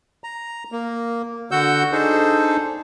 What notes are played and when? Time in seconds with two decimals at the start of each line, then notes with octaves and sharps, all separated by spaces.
0.24 A#5
0.72 A#3
1.51 D3 F#4 F#5 E6 G6
1.92 D4 D#4 G#4 A4 C5